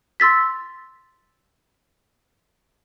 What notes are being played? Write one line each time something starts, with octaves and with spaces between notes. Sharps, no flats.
C6 E6 A6 B6